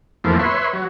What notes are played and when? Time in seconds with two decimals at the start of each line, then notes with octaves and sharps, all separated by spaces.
0.24 F2 E3 F3 A3 A#3
0.39 B4 C#5 E5 C6
0.73 F#3